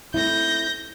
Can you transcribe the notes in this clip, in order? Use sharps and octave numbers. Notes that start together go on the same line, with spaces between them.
A3 C4 E4 G6 A#6